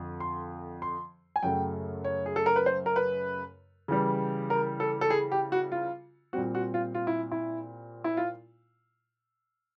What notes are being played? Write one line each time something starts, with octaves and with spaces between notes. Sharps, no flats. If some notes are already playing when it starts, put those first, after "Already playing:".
Already playing: F2 D3
C6
C6
G#5
F#2 C#3 F#3 A3 G5
C#5
G#4
A4
A#4
B4
C5
A#4
B4
C#3 E3 G3
A#4
A4
A4
G#4
G4
F#4
F4
A#2 G3 C4 F#4
F#4
F4
F4
E4
E4
E4
F4